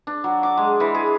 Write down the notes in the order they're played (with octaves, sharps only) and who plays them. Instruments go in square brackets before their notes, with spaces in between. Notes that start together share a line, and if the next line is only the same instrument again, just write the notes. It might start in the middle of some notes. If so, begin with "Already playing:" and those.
[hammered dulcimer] D4
F#3
D6
G#3
E3
G#4